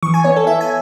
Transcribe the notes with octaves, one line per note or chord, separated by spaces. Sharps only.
E3 C#6
G#5
B3 C#5
A4
E3 E5
G#5